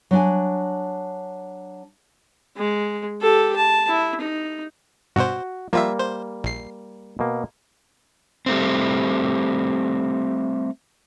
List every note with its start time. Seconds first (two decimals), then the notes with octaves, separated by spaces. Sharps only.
0.11 F#3 D4 G#5
2.57 G#3
3.21 G4 A4
3.56 A5
3.88 E4
4.21 D#4
5.16 G2 B2 F#4 C5
5.73 F3 G3 A#3 F4 E5
5.99 C5
6.44 A#1 C7
7.19 B2 A#3
8.46 G3 A3 C4